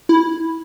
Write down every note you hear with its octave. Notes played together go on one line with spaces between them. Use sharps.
E4